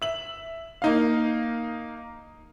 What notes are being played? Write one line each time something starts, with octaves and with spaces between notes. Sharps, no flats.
E5 F#7
A#3 D#4 F5